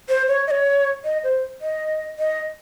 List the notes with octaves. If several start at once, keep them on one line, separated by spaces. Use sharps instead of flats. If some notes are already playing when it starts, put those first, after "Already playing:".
C5
C#5
D#5
C#5
D#5
C5
D#5
D#5